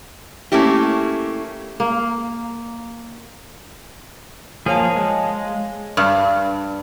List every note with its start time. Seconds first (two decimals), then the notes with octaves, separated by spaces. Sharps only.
0.52 A3 A#3 C#4 E4 G4
1.80 A#3
4.66 F3 A#3 G#4 C#5 F5 A5
4.96 G#3
5.97 G2